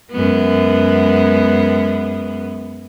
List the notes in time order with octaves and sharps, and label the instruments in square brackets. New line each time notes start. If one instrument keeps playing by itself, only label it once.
[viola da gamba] F#2 G#3 B3